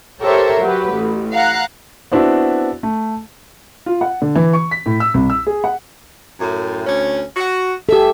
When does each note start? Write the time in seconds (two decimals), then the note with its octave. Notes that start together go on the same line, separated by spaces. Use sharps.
0.22 G4 A4 A#4 C5 C#5 E5
0.62 F#3 F#4 G4 B4
0.94 A1
1.33 F5 F#5 A#5 F#6
2.12 B3 C4 D4 E4 F#4
2.83 A3
3.86 F4
4.01 F#5
4.22 D3
4.35 E3
4.53 C#6
4.71 B6
4.86 A2
5.00 E6
5.14 C2
5.30 E6
5.47 G#4
5.64 F#5
6.39 F#2 A2
6.86 D2 C#4
7.36 F#4
7.89 G4 A4 E5